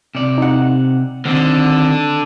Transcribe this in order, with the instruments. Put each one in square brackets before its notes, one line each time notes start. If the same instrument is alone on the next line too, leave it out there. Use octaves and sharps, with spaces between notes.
[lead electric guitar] C3 D5
[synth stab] D#4 F#5
[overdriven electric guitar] D3 [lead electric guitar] D#3 C4